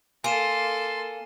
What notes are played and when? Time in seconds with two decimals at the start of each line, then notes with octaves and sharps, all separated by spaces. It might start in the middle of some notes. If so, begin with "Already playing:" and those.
0.24 A#3 A4 G#5 C6 D#7 E7